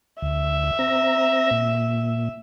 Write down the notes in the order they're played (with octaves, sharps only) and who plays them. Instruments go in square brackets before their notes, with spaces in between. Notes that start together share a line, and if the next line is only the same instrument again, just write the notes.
[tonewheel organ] D2 [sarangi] E5
[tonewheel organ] C4 A#5
A#2